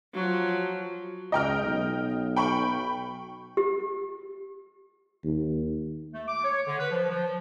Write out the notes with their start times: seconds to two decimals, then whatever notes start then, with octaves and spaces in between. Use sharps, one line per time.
0.14 F3 F#3
1.32 C#2 D#5 G5 F6
1.63 B1
2.36 G5 B5 C#6
3.57 G4
5.24 D#2
6.14 A3
6.28 D6
6.44 C#5
6.67 D3
6.79 B4
6.91 F3
7.09 F3